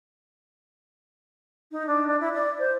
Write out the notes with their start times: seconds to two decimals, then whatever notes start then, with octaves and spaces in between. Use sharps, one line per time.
1.71 D#4
1.87 D4
2.06 D4
2.20 E4
2.33 D5
2.59 C5